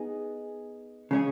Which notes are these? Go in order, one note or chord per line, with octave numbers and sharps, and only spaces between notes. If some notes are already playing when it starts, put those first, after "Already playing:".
Already playing: B3 D#4 G#4
C#3 G#3 C#4 G#4